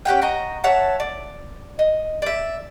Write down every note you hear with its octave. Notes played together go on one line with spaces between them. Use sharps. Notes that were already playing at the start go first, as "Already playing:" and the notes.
C#4 G4 F#5 G5
F#4 D#5 A#5
C#5 E5 F#5 A5
D5
D#5
D5 E5